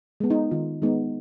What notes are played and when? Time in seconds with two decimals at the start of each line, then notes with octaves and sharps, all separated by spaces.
0.20 G#3 B3
0.30 D#4
0.51 D#3 F4
0.82 G#3 B3 D#4